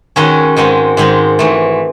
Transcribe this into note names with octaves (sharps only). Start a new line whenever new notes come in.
D#3 G#3 C#4 F#4
G#2 D#3 G#3 C4
G#2 D#3 G#3 C4
G#2 E3 A3